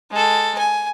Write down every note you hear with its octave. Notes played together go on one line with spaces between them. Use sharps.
G#3 A4
G#5